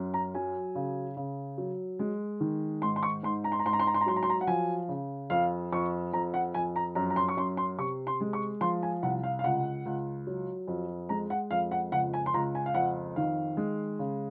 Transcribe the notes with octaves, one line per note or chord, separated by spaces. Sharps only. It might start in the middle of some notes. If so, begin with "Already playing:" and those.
Already playing: F#2
A#5
F#3 G#5
C#3
C#3
F#3
G#3
D#3
G#2 C6
C6
C#6
G#2 C6
A#5
C6
A#5
G#2 C6
A#5
C6
A#5
C6
A#5
F#3 C6
A#5
C6
A#5
F#5
F3 G#5
C#3
F2 F5
F2 C#6
F2 A#5
F#5
F2 G#5
A#5
F#2 A#5
A#5
C6
C#6
F#2 C6
C6
C3 C#6
C6
G#3
C#6
F3 C6
G#5
C2 F#5
F5
F5
C#2 F#5
C#2
F#3
F2
G#3 A#5
F#5
F2 F5
F#5
C#2 F#5
G#5
C6
C#2 A#5
G#5
F5
F2 F#5
D#3 F5
G#3
C#3